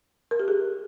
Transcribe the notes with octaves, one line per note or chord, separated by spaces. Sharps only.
A#4
G4
G#4